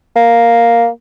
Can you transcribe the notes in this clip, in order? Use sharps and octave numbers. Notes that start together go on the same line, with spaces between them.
A#3